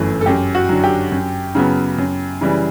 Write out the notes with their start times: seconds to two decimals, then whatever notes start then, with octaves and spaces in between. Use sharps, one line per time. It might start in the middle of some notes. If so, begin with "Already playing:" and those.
Already playing: G1 F#2 E3 A3
0.21 A4
0.26 F#2 G4
0.55 F#4
0.69 D3 F#3
0.84 G4
1.12 F#2
1.55 C#3 F#3 B3
1.98 F#2
2.41 C#3 E3 G3